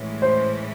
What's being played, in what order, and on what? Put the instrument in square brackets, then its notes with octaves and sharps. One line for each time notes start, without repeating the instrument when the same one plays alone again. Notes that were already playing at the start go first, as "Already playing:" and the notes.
Already playing: [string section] A2 E3 G#3 C#4 E4
[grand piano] C5